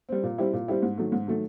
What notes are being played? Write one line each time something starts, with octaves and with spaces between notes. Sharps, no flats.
G3 C4
A#2
G3 C4 E4 G4
A#2
G3 C4 E4 G4
G#2
D#3 F#3 A3
G#2
D#3 F#3 A3